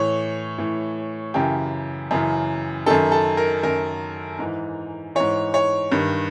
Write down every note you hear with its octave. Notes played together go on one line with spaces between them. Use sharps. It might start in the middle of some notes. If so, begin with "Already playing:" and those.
Already playing: A2 E3 C#5
A2 E3
F#2 C#3 E3 G4
F#2 C#3 E3
F#2 D#3 A4
A4
A#4
F#2 D#3 A#4
G#2 E3
G#2 E3 C#5
C#5
G2 D#3